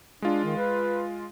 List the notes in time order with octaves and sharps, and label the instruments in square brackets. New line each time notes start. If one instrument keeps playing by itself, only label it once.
[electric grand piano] G#3 F4 [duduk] D4
[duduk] D#3
B4